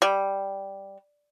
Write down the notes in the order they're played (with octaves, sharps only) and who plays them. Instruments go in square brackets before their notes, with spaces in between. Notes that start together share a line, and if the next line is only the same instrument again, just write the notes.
[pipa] G3